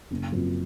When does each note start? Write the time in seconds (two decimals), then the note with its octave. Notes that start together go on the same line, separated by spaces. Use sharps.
0.11 F#1
0.32 F#2 F3 C4